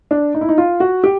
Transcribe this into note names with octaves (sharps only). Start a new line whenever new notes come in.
D4
D#4
E4
D#4
F4
F#4
G4